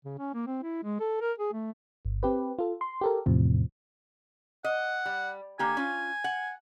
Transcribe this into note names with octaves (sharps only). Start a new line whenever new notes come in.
C#3
C#4
A#3
C4
E4
G#3
A4
A#4
G#4
A3
G1
C4 G4 B4
F4 A4
C6
G4 A4 A#4
E2 A2 C3 F3
D#5 F#5
G3
D3 A#3 G4 G#5
C#4 F4
F#5